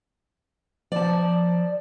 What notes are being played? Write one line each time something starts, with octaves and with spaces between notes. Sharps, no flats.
F3 D5 A5